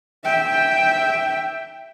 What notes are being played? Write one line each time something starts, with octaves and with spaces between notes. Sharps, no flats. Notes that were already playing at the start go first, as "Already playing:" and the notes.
E5 G5